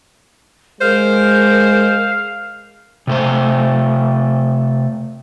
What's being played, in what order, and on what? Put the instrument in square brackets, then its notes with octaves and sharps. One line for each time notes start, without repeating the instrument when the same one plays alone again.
[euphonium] G#3 [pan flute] A#4 [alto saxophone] C5 [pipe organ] F5
[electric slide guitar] C3 A3 C5